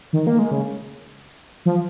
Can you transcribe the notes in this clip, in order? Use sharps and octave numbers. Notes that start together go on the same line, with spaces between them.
D#3
A#3
G#3
C#3
F3